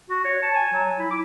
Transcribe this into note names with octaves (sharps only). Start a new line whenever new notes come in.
F#4
C#5
A5
G#5
F#3
E4
D6